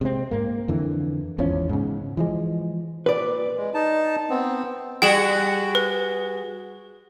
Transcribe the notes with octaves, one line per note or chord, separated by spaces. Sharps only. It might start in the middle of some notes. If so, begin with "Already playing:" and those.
C3 G#3 C4
G#2 A#3
F2 D3 E3
G#1 E2 F3 C#4
G#2 C#3
E3 F3 G#3
A#2 B4 D5
G#3
D#4 A5
B3 C4
G3 F#4 G#4 G5 E7 F#7
B4